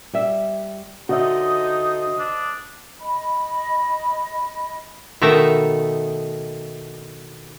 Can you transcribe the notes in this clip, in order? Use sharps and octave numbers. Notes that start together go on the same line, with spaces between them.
G3 E5
D3 D#4 F#4 C5 D#5 E5 D#6
D4
D#5 B5
B2 D#3 A3 E5 A#5